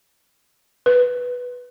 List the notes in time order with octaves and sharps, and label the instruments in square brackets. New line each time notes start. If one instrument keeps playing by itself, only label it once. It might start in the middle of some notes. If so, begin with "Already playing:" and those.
[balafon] B4